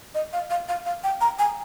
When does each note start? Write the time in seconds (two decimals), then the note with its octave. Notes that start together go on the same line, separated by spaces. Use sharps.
0.15 D#5
0.33 F5
0.50 F5
0.68 F5
0.86 F5
1.04 G5
1.21 A#5
1.39 G#5